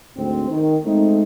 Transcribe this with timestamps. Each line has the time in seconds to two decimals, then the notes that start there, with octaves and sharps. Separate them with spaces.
0.17 D2 G#2 C4
0.50 D#3
0.85 G#3 A3 C4 D#4